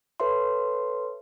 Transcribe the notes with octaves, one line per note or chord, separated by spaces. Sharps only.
A4 B4 C#5 E5 C6